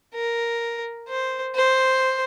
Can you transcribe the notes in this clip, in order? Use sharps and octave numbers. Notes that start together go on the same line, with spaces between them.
A#4
C5
C5